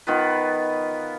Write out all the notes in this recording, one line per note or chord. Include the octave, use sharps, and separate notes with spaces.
D#3 B3 F4 B4